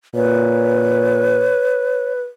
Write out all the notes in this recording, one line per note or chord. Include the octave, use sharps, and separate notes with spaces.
A#2 B4 C#5